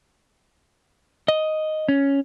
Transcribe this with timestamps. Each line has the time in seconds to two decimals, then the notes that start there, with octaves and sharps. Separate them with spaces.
1.28 D#5
1.89 C#4